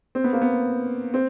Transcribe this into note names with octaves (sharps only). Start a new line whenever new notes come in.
C4
B3
A#3
B3
C4